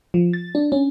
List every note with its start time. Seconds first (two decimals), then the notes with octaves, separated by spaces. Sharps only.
0.14 F3
0.33 A6
0.55 D4
0.72 C#4